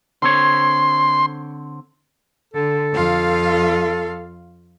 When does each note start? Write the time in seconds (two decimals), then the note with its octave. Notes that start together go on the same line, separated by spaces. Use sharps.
0.22 D3 C4 C#5 C6
2.54 D3 A4
2.93 F2 F4 F5